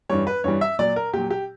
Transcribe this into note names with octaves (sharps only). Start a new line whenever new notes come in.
G2 E3 G3 C#5
B4
G2 E3 G3 C#5
E5
A#2 F#3 D5
A#4
A#2 F#3 G4
G4